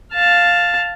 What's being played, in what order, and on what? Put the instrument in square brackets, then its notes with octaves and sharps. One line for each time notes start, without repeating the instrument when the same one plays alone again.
[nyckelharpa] F5 A5